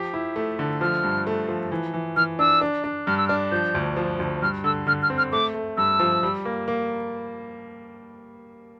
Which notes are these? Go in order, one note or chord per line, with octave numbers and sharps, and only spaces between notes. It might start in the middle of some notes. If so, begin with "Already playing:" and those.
Already playing: F3 G4
E4
A3
D3
F3 F6
G2
A3
F3
E3
E3
E3 F6
D4 E6
D4
D4
G2 F6
E6
D4 F6
F3 G6
D2
F3
D2
G2 F6
D3 E6
D3 F6
F6
C4
F6
A3 D6
A3
G2 E6
F3
G3
A#3
A#3